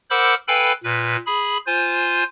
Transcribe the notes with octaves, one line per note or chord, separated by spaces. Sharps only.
A#4 C5 F#5 B5 D6 E6
A4 B4 F5 G5 G#5 B5
A#2 B4
G#4 B5
F4 C5 G#5